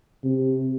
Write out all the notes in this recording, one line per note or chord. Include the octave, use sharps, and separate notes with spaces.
C3